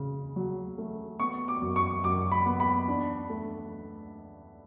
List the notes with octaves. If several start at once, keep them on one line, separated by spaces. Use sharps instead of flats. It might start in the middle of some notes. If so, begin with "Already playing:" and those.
Already playing: C#3
F#3
A3
B3 C#6
D6
F#2
C#6
F#2 D6
B5
B3
B5
D4
A3